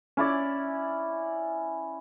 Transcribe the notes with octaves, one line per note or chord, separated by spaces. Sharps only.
C#4 E4 D5